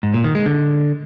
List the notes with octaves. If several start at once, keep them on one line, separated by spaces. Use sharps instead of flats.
G#2
A#2
D#3
G#3
D3